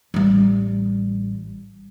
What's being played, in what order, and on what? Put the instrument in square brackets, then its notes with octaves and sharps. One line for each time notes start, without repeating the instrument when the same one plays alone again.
[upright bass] A1 G3